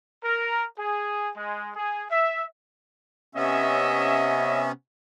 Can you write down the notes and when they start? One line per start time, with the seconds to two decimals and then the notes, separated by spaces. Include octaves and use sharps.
0.24 A#4
0.79 G#4
1.37 G#3
1.76 G#4
2.11 E5
3.35 C3 B3 C#4 C#5 D#5 E5